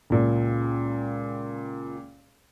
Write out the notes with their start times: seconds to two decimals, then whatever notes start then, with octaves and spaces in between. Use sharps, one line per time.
0.10 C#2 A#2